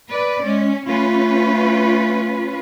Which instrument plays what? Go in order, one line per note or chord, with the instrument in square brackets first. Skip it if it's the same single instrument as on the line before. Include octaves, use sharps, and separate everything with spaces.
[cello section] B4 D5
[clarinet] G#3 [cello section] C#4
[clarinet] A3 [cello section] C#4 F4 B4